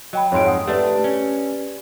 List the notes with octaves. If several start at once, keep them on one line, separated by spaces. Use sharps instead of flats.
F#3 D#5 G5 B5
F2 G#2 C#5 C6 D7
F#5 D#6
A3 D4 G4 B4 D5
C#4